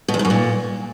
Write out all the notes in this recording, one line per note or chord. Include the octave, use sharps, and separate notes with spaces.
B2
E2
G#2
F#2
A#2